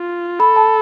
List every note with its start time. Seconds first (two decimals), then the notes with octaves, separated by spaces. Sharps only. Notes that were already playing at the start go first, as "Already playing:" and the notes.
Already playing: F4
0.40 A4 B5
0.56 A5